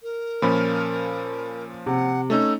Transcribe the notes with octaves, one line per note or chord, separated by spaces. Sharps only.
A#4
A#2 F3 C#4 B5
C3 F#5
A3 C#4 D#4 E6